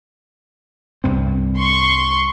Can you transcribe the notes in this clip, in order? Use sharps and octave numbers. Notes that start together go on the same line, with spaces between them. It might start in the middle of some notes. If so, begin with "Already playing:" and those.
C2 G2 C4
C6 C#6